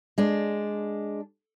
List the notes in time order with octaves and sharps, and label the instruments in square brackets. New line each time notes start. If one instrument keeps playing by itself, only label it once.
[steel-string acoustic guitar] G#3 D4